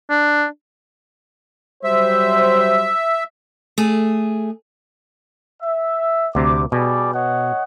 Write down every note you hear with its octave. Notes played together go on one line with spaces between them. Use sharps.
D4
F#3 G3 C5 E5
A3 G#4
E5
D2 C3 D6
B2 G3 G#4 D5
C#5 D#5 F#5